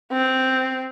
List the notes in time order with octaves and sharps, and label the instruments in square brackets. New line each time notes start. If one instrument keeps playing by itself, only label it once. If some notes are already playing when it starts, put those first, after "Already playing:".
[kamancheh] C4